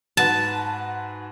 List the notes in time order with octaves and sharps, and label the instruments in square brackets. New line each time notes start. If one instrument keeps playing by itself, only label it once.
[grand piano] G#2 F#4 B4 [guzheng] A5